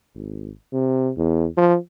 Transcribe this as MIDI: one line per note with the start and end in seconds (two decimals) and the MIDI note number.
0.15 0.51 32
0.73 1.11 48
1.17 1.46 40
1.58 1.76 53